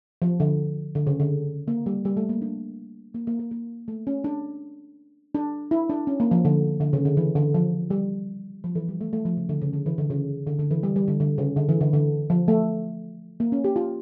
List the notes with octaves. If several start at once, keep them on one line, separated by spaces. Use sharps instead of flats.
F3
D3
D3
C#3
D3
A#3
G3
G3
A3
A#3
D4
A#3
A#3
A#3
A#3
A3
C#4
D4
D4
E4
D4
C#4
A#3
F3
D3
D3
C#3
D3
E3
D3
F3
G3
F3
E3
G3
A3
A3
F3
C#3
D3
C#3
D3
E3
D3
C#3
D3
D3
E3
G3
G3
D3
D3
C#3
D3
E3
D3
D3
F3
A3
A#3
C#4
G4
F4